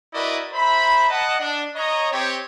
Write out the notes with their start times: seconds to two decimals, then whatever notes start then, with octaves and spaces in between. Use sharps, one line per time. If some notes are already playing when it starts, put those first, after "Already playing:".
0.14 E4 F#4 A#4 B4 D5 D#5
0.53 C5 E5 A#5 B5
1.09 D#5 F#5 A5
1.40 D4
1.76 C#5 D#5 A#5
2.12 C4 G4 C#5